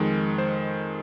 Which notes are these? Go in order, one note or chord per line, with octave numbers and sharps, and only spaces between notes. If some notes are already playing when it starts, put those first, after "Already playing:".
Already playing: F2 D#3 G#3
C5